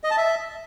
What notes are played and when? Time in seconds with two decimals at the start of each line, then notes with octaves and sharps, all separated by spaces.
0.04 D#5
0.11 A5
0.17 E5